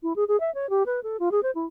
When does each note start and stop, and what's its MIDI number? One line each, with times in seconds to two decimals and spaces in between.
0.03 0.13 64
0.16 0.24 68
0.28 0.39 68
0.40 0.53 76
0.55 0.69 73
0.70 0.83 67
0.86 1.00 71
1.03 1.17 69
1.20 1.29 65
1.31 1.40 68
1.43 1.51 72
1.55 1.66 64